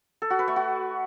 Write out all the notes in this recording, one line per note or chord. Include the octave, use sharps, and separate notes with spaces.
A4
F#4
B4
A3
F#4